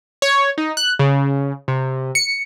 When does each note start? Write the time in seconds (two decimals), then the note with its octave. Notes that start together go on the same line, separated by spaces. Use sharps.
0.22 C#5
0.58 D#4
0.77 F#6
0.99 C#3
1.68 C3
2.15 C#7